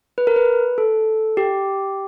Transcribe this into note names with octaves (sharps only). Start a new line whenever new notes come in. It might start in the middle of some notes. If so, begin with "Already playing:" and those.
B4
A#4
B4
A4
G4